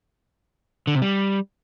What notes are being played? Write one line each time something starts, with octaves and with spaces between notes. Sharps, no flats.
D3
C3
G3